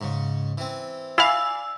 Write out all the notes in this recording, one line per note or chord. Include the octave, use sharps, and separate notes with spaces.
G#2 C#3
E3 C4
E4 D5 F5 G#5 E6